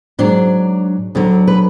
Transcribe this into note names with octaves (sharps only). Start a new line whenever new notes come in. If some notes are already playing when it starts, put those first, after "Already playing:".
G#2 F#3 D4
D2 D3 F#3
B4